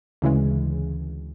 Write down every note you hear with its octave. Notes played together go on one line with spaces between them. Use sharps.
D2 C#3 E3 G#3